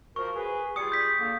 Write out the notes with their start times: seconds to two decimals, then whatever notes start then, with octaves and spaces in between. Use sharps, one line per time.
0.16 F3 F#4 A#4 C#6
0.35 G#4 B4
0.76 G3 F4 G#4 D#6 C#7
0.92 G6 B6
1.19 D3 A#3